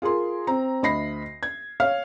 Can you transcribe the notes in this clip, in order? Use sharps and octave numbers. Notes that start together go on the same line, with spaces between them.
F4 G#4 A#4 C6
C4 A#5
D2 D#5 B5 A#6 C7
G#6
C#5 F5 F6